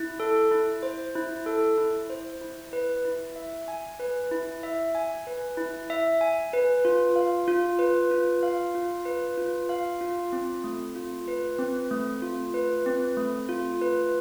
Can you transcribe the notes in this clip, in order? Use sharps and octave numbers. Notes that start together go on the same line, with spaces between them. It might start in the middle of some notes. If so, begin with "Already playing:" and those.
Already playing: E4
A4
E4
C5
E4
A4
E4
C5
E4
B4
E4
E5
G#5
B4
E4
E5
G#5
B4
E4
E5
G#5
B4
F4
F5
F4
B4
F4
F5
F4
B4
F4
F5
F4
C4
A3
F4
B4
C4
A3
F4
B4
C4
A3
F4
B4